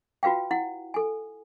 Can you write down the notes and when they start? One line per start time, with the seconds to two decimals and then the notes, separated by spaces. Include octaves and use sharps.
0.23 F4 F#4 B4 F5 G5
0.51 E4 F#5
0.94 A4 G#5